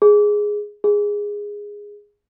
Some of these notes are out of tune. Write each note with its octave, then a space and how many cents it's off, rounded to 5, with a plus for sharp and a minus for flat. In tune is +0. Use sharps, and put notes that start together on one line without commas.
G#4 +0
G#4 -10